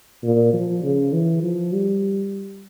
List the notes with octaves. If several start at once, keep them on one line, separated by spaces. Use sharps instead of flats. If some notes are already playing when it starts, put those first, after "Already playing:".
A#2
F3
C#3
E3
F3
G3